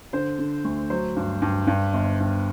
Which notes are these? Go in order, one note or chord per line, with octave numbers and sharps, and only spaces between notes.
D3 C5
D3
D2
F#3 C5
G2
G2
G2
G1
G2